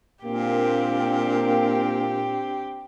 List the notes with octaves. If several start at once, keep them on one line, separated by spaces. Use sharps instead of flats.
A#2 A#3 C4 D4 G4